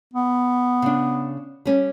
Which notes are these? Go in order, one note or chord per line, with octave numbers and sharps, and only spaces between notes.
B3
C#3 D4
G3 C#4